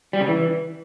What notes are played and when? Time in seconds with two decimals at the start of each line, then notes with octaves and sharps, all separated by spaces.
0.13 G3
0.21 C#3
0.28 E3